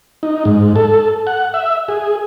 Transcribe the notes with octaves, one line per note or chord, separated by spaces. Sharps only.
D#4
G#2
A4
F#5
E5
G#4